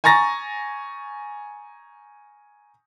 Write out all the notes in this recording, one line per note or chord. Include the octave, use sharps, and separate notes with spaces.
G#5 A#5 C#6 A6 A#6